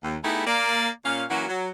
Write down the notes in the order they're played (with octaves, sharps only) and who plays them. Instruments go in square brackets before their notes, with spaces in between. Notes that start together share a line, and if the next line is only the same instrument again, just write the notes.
[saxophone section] D#2
A3 B3 D#4 E4 G4 G#4
A#3 D5
A#2 C#4 F5
E3 F#3 A#3 C#4 F#4
F#3